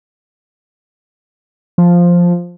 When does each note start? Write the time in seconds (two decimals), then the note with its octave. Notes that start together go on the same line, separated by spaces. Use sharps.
1.78 F3